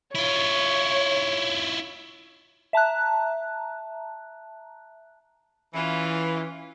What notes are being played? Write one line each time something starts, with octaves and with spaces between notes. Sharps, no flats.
E4 F4 C#5
E5 A5 A#5 F#6
E3 C#4 F4